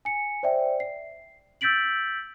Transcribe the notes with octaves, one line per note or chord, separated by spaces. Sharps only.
G#5 C#7
C5 D5 E5 G5
C7
E6 G6 A6 B6 D7 F#7